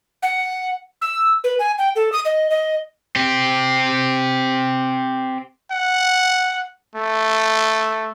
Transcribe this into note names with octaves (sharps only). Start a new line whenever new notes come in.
F#5
E6
B4
G#5
G5
A4
D#6
D#5
D#5
C4 G4
F#5
A3